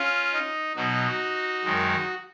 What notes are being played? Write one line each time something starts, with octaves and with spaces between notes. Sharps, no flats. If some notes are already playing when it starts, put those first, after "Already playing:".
Already playing: C#4 F4
D#4
B2 F#3 D#4 F#4
F#2 D#3 G#3